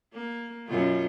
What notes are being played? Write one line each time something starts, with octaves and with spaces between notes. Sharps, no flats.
A#3
F#2 B2 F4